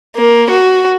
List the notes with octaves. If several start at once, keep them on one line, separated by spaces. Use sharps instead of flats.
A#3
F#4